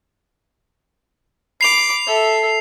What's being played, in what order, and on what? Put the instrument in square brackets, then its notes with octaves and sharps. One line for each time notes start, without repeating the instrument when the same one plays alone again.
[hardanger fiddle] B5 D6 [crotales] C7 F7
[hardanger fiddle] A4 E5